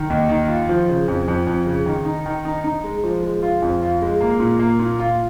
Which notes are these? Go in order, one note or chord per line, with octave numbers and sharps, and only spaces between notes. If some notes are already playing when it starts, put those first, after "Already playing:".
Already playing: D#3
D#2
D#3
F4
F3
C#3
F2
F2
F2
C#3
D#3
D#4
D#3
D#4
D#4
G#3
F3
G#3
F4
F2
F4
G#3
A#3
A#2
A#3
A#2
F4